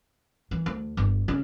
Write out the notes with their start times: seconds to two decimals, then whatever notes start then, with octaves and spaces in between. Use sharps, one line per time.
0.51 E3
0.66 D2
0.97 G1
1.28 C#3